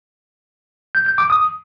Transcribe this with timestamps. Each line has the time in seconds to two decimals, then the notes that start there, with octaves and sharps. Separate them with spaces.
0.95 G6
1.06 G6
1.18 D6
1.30 D#6